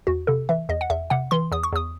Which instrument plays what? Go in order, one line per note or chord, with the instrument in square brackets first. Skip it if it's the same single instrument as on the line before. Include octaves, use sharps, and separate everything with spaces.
[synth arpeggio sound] E2 F#4
C3 A4
E3 E5
E2 D#5
F#5
E2 E5
C3 F#5
E3 C6
E2 D#6
C#6
E2 D#6